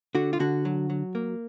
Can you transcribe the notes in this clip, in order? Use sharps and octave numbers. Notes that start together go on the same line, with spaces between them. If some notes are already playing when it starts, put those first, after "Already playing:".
D3 F#4
F4
D3 F#4
F#3
F#3
A#3